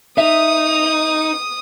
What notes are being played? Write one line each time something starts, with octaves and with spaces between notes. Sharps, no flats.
D#4 E5 D#6